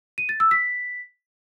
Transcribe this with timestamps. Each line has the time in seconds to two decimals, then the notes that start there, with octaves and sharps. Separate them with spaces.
0.18 D#7
0.29 A6
0.40 E6
0.51 B6